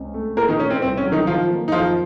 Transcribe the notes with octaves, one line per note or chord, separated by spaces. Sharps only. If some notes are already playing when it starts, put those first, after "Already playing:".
Already playing: C#2 C#3 C4
A3
A#2 A#3 A#4
D#3 D#4
A3 C#4
C4
C2 C4
C#4
F#3
D#3 D#4
D#3 F3 F4
A#3
D#4
F2 F3 F4